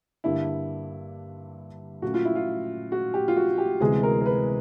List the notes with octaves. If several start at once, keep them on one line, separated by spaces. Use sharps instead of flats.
G2 D3 G3 A#3 D4 E4
A#2 F#3 A3 C#4 F#4
F4
E4
F4
F#4
G4
F4
F#4
G4
D2 C3 E3 G#3 B3 G#4
A#4
A#4
B4